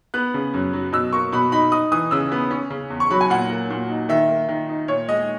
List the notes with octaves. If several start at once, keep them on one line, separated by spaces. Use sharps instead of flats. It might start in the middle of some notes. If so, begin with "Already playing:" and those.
B3 F#6
C#3
F#2
F#3
B2 E6
A#3 C#6
B2 B5
D#4 B5
D#4 D#6
E3 D#6
C#3 E6
B3
C#4
C#3
E2
C#6
F#3 B5
G#5
A#2 F#5
A#3
A#2
D#4
D#3 E5
A#3
D#3
D#4
A#2 C#5
G#3 D#5